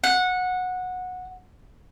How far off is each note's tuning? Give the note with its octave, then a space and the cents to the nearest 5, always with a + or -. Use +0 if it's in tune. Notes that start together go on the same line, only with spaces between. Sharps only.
F#5 -15